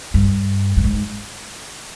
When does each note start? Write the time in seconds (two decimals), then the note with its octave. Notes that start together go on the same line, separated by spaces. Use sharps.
0.14 G2
0.77 G2
0.84 G#2